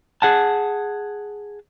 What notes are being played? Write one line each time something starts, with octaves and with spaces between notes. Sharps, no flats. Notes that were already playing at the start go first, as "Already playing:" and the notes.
G#4 F#5 A5